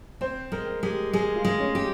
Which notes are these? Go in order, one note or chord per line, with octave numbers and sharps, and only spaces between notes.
C4 C5
G#3 A#4
G#3 G4
G#3 G#4
F4
G#3
C#4
G4